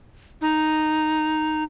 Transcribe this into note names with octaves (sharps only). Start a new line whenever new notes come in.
D#4